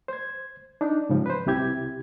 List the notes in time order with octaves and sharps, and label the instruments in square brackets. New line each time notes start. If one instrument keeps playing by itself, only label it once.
[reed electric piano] C5 G#6
D4 D#4
G#2 C#3 F3 G3
B4 C5
C2 C3 E4 G4 G#6